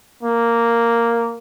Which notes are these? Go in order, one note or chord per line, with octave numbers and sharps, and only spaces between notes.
A#3